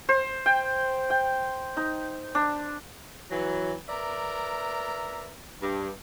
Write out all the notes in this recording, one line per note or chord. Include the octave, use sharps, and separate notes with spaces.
C5
G5
G5
D#4
D4
E3 F#3
A#4 B4 D5 E5 A#5
G2